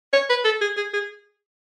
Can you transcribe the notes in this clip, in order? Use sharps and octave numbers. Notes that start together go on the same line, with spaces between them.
C#5
B4
A4
G#4
G#4
G#4